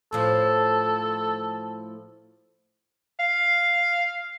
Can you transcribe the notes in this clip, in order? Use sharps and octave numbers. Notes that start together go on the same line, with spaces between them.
A2 F3 A4
F5